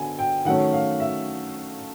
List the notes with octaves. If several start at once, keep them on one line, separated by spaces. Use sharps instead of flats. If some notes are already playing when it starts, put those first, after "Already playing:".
Already playing: D3 B3 G#5
G5
D#3 F#3 A3 C#4 F#5
F5
E5